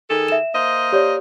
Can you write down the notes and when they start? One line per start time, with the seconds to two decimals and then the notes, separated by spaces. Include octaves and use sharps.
0.10 D#3 G#4 A4
0.28 E5 E7
0.54 A#3 C5 D#5
0.92 G4 C#5 D5